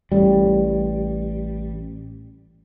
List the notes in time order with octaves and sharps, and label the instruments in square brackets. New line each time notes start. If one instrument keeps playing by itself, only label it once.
[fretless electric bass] A1 G3